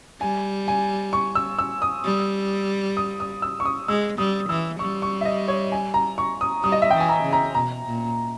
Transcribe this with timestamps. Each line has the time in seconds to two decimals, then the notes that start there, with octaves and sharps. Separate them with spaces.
0.21 G3 G#5
0.68 G#5
1.13 C#6
1.35 E6
1.58 E6
1.82 D#6
2.04 G3
2.97 D#6
3.20 D#6
3.42 E6
3.60 C#6
3.65 D#6
3.88 G#3 E6
4.18 G3 D#6
4.49 E3 E6
4.79 G3 C#6
5.02 C#6
5.21 E5
5.25 D#5
5.48 C#5
5.72 G#5
5.94 A#5
6.18 C#6
6.41 D#6
6.63 G3 D#6
6.72 D#5
6.82 E5
6.91 E3 G5
7.00 G#5
7.09 A#5
7.24 C#3
7.33 A#5
7.55 B2 A#5
7.86 A#2